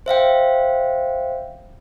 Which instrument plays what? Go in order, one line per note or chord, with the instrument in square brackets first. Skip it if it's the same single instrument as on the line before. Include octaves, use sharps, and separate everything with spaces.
[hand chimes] C5 E5 F5 G5